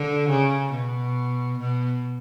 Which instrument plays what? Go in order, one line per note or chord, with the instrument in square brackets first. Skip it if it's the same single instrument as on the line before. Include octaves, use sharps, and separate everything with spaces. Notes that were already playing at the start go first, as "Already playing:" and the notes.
Already playing: [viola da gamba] D3
C#3
B2
B2